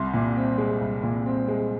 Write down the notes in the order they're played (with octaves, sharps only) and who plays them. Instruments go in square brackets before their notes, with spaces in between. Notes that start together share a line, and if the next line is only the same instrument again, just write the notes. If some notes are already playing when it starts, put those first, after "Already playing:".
Already playing: [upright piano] C2 C6
A#2
C4
G#3
C2
A#2
C4
G#3